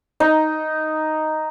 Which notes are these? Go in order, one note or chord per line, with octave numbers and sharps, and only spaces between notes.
D#4